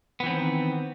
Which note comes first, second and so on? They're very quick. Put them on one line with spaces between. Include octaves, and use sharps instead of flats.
B3 E3 C4 D#3